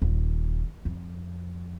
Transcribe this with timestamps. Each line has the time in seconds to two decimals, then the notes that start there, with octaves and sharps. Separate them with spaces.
0.02 D#1
0.85 F2